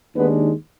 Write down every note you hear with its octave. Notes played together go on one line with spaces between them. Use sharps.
D#2 D#3 G#3 B3 D4 B4